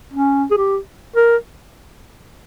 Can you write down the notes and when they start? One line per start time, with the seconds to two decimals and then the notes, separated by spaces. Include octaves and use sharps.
0.13 C#4
0.51 G#4
0.57 G4
1.16 A#4